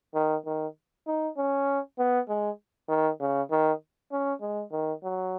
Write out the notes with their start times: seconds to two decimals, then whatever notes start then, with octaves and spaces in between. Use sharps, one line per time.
0.14 D#3
0.46 D#3
1.07 D#4
1.37 C#4
1.98 B3
2.29 G#3
2.89 D#3
3.20 C#3
3.51 D#3
4.12 C#4
4.41 G#3
4.72 D#3
5.03 F#3